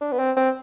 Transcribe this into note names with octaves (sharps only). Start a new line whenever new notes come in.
D4
B3
C4
C4